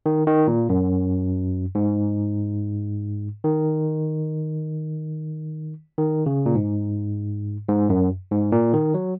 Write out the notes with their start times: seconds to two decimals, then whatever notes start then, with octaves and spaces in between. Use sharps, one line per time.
0.06 D#3
0.27 D#3
0.48 A#2
0.69 F#2
1.75 G#2
3.44 D#3
5.98 D#3
6.26 C#3
6.46 A#2
6.55 G#2
7.68 G#2
7.90 F#2
8.31 G#2
8.52 A#2
8.73 D#3
8.94 F#3